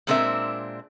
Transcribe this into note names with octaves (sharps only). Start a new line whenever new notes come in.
A#2 G#3 C4 D4 A#4 E5